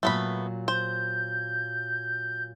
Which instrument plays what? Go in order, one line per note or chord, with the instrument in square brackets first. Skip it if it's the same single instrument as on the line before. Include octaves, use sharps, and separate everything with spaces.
[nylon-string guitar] A#2 F#3 [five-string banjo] A3 B3 B5
[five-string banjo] C5 [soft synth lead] G6